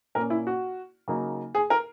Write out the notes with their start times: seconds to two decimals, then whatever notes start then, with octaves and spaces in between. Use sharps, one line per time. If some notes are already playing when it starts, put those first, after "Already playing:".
0.15 A#2 A#3 C#4 A#4
0.30 E4
0.47 F#4
1.08 C#3 F#3 A#3 D#4
1.55 G#4
1.70 A#4